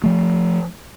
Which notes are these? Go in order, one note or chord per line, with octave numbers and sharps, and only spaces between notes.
F3 A3